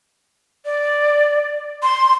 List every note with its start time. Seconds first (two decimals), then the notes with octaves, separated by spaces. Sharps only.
0.65 D5
1.83 C6